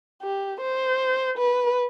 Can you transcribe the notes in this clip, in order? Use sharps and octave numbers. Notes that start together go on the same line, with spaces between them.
G4
C5
B4